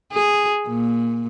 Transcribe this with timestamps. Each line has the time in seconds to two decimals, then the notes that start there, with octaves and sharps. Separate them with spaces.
0.13 G#4
0.68 A#2